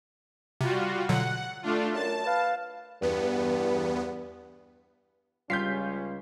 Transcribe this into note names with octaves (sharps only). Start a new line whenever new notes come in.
C3 G3 F4 F#4
B2 D3 F#3 F#5
A3 D4 F4
F#2 A5
B4 F5
E2 G2 B3
C#2 G3 C#4 F4 G6 B6 C7